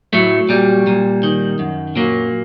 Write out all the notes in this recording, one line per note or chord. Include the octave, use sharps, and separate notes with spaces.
A2 F#3 A3
A#2 G3
A#2
D#3
F#2
A#2 F#3 A#3